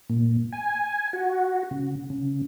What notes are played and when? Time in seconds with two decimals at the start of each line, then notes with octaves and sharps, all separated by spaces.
0.10 A#2
0.53 G#5
1.13 F#4
1.71 C#3
2.10 C#3